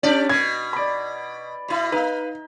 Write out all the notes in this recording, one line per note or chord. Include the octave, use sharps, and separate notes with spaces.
C#4 D4 G4 D5
B2 G#6
D5 B5
B2 E4
D#4 B4 F5